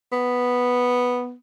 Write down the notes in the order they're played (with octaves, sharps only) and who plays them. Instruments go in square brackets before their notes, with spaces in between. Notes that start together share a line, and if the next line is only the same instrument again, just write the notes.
[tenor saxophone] B3